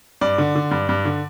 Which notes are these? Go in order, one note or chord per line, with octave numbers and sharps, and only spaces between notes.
G2 D5
D3
D3
G2
G2
D3